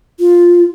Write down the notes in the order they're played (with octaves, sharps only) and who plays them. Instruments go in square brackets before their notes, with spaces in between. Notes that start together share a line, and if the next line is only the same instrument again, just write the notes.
[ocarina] F4